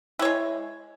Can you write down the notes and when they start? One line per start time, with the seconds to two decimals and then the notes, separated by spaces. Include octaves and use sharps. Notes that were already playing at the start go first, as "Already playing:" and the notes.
0.19 E4
0.22 C#5
0.25 G#3